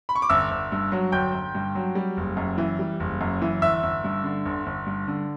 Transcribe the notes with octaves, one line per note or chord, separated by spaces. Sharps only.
B5
C#6
D6
G1 E5 E6
G1
G2
F#3
G1 G5 G6
G1
G2
F#3
G3
F#1
F#2
E3
G3
F#1
F#2
E3
G1 E5 E6
G1
G2
D3
G1
G1
G2
D3